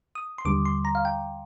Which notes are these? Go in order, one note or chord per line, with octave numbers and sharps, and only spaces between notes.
D#6
C6
D#2 D3 G3 D6
C6
A#5
F5
G5